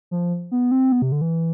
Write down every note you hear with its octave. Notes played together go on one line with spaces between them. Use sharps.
F3
B3
C4
B3
C3
D3
E3